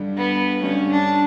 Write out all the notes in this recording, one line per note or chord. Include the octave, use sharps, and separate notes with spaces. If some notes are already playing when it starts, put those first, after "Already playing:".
Already playing: G2 D3 G3
B3
G2 D3 G3 C#4
D4